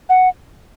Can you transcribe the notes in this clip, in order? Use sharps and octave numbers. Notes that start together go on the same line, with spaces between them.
F#5